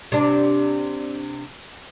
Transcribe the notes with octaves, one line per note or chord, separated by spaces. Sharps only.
C3 D4